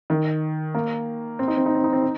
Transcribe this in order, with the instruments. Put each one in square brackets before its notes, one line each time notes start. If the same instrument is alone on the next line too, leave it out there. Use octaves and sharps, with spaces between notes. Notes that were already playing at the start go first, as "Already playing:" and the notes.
[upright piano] D#3
A#3
C4
D#4
C4
D#4
C4
D#4
C4
D#4